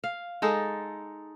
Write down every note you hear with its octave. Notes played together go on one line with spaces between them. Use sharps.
F5
G#3 D#4 A4